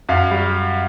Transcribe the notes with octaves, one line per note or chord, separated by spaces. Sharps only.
F#2 F5
G3